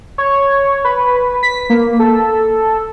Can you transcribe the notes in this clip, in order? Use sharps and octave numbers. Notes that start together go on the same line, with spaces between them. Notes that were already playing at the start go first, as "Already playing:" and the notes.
C#5
B4
B6
A#3
A4